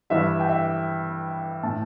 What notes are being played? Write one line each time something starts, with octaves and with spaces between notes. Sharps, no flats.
G2 E3 G3 E5
G5
E5
A2 A3 A5